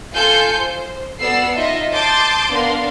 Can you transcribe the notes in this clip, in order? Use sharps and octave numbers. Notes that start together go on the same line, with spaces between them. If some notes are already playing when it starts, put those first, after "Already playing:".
F4 A4 G#5 G6 C#7
C5
B3 F#4 A4 D5 E6 C7
D#4 F4 D#5 E5
A5 C6 D6 D#6 G6 A6
B3 D4 A#4 F5 C6